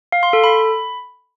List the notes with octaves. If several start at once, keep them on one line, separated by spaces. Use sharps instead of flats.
F5
C6
A4
B5